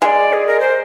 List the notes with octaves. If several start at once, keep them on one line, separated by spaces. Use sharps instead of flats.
G#3 D5 F5
G#4
A#4
C5